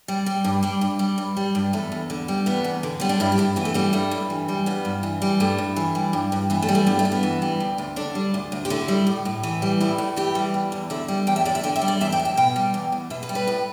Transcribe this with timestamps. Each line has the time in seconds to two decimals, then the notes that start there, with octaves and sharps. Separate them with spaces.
0.08 G3
0.26 G3
0.44 G2
0.63 G3 D4
0.81 G2
0.99 G3
1.18 G2
1.37 G3
1.55 G2
1.73 E2 A3
1.92 E2
2.10 D3
2.28 G3
2.46 E2 B3
2.64 E2
2.83 D3
3.00 G3 B3
3.09 D4
3.20 G2 E4
3.32 G4
3.38 G2 E4
3.56 E3 B3
3.65 A3
3.74 G3 B3
3.93 G2 A3
4.11 G2
4.30 E3
4.48 G3
4.66 G2 B3
4.85 G2
5.03 E3
5.22 G3
5.40 G2 A3
5.58 G2
5.76 E3
5.95 G3
6.13 G2
6.32 G2
6.50 E3 B3
6.62 A3
6.69 G3
6.75 A3
6.87 G2 B3
6.99 A3
7.05 G2
7.12 B3
7.23 E3
7.42 G3
7.60 D2
7.78 D2
7.96 D3 D4
8.15 G3
8.34 D2
8.52 D2
8.65 G4
8.70 D3 E4
8.88 G3
9.07 A2
9.25 A2
9.43 E3
9.62 G3
9.81 A2 E4
9.98 A2
10.16 E3 G4
10.35 G3
10.54 E2
10.72 E2
10.90 D3 E5
11.08 G3
11.27 E2 G5
11.36 E5
11.45 E2 D5
11.55 E5
11.63 D3 G5
11.76 E5
11.82 G3
11.88 D5
12.01 E2 E5
12.12 G5
12.19 E2
12.25 E5
12.37 B2 G5
12.56 G3
12.74 E2
12.92 E2
13.10 B2 E5
13.23 B4
13.29 G3
13.35 B4
13.47 A2